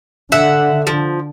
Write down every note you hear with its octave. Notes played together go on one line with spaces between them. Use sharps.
D3 E5 F#5
F3